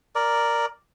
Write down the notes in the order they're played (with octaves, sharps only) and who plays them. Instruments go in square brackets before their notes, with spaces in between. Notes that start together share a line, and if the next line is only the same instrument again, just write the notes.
[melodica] A#4 D5